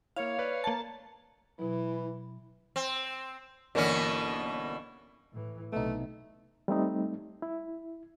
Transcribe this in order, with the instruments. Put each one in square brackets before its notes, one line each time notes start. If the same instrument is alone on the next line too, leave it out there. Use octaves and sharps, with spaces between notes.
[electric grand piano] A#3 E4 [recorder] C#5 [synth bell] F5
[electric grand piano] B4 D5
[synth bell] A#3 A5
[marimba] B2 F#3 [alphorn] E3 [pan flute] E4
[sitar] C4
[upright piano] G1 A#3 D5 [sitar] B2 E3 C#4
[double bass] A2 E3
[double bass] B1 C3 [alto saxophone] A3 [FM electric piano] B3 D#4
[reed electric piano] G3 A3 C4 D#4
E4